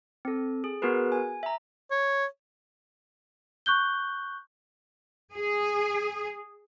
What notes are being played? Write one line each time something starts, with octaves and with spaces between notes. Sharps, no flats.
C4 A4
G#4
B3 F#4 G#4 A#4 B4
G#5
E5 A#5
C#5
C#6 F#6 G6 G7
G#4